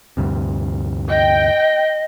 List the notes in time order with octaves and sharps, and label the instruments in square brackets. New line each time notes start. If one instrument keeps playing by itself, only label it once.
[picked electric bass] D2 G2 C3
[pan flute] D#5 [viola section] G5